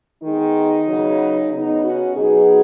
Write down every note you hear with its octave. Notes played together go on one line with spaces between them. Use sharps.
D#3 G#3 B3 D#4
C#3 F#3 B3
C#3 B3 D#4
C#4 F#4
B2 F#3 B3 D#4 G#4